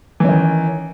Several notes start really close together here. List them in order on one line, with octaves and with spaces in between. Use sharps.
E3 C#4 D#3